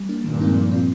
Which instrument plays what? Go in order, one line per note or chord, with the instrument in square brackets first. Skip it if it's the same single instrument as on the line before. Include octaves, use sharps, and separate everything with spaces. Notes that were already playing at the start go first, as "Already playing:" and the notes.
Already playing: [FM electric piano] G3
A#3 D4
[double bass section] G2 A#2 [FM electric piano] D#3
[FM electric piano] G#3 C4 D#4
F3
C4 F4